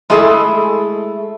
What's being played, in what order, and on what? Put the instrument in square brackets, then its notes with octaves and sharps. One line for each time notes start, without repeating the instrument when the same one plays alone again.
[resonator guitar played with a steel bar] G#3 A3 E4 G#4 A4